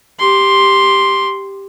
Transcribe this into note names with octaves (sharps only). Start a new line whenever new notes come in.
G4 C6